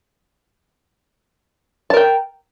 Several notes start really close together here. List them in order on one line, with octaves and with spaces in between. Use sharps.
A5 A#4 G5